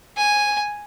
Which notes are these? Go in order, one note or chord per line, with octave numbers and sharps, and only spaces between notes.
G#5